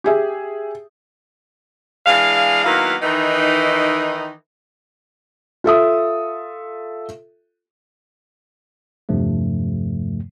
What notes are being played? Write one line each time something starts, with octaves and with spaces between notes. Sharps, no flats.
G4 G#4 E5
E3 G#3 D4 F5
D#3 F#3 A#3 B3 E4 F5
D#3 E3 D#4
F4 A4 E5 D#6
E2 G2 C3 F3 A3